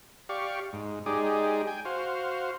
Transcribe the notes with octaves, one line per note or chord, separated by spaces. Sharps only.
G4 D5 F5 C#6
G#2
G#3 D#4 G4 G#4 D5
G5 G#5
F#4 C5 F5